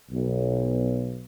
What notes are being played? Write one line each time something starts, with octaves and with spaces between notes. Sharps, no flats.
B1